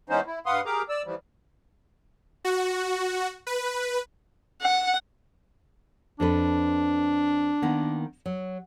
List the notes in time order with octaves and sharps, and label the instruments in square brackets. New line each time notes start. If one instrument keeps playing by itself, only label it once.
[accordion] E3 G#3 B3 C#4 D#4 C5
E4
G2 B4 F5 F#5 C6 D#6
G4 G#4 A#4 A#5 D6
D5 E6
E3 F3 G3
[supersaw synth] F#4
B4
[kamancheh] F#5
[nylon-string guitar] F2 A4 B4 [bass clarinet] D4
[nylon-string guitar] D#3 A#3 B3
F#3